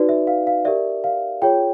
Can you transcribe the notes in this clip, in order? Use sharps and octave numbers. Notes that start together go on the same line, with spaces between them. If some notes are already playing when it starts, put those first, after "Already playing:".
Already playing: D#4 F#4 B4 D5
E5
F5
F5
G4 A#4 D5 E5
F5
F4 G#4 C#5 G5